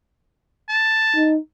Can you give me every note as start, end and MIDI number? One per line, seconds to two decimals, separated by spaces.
0.69 1.29 81
1.15 1.38 63